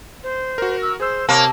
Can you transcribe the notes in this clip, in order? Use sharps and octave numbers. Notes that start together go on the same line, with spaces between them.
C5
F#4 A#4
E6
G#4 C5 E6
C3 A#3 C#5 A5